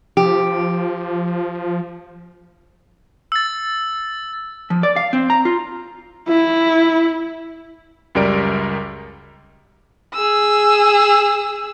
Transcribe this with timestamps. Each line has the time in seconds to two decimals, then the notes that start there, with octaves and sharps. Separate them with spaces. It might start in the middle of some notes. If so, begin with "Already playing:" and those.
0.17 F3 G4
3.32 E6 A6
4.70 F3
4.83 D5
4.96 F5
5.13 C4
5.30 A#5
5.45 F4
6.29 E4
8.15 C#2 F#2 G3 A#4 D5 D7
10.14 G#4 E6